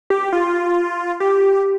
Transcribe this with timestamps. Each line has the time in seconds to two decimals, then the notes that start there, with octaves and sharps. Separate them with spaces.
0.10 G4
0.33 F4
1.20 G4